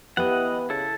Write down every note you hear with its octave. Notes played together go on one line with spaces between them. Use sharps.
E3 B3 E4 G4 D#5 F#5
C#3 E4 A4